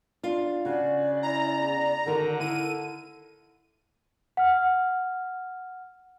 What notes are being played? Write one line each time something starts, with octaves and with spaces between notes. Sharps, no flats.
D4 F4
C#3 F#4 D5
E4 A#5
E2
D3 D#3 D#4 F#4 A#4
E4 A#4 D#7
F#5 F6